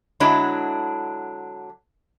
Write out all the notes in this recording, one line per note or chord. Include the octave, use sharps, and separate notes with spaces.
D3 F#3 G#3 D4 E4